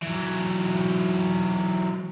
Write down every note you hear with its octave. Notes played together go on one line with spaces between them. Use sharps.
E3 F#3